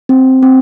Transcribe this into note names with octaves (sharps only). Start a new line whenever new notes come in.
C4
C4